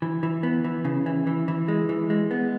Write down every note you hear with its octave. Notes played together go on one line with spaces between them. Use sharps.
E3
E3
B3
E3
C#3
E3
E3
E3
G#3
E3
G#3
B3